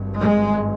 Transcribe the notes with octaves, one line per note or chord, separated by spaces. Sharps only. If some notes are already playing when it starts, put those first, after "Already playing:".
Already playing: G#1 G2
G#3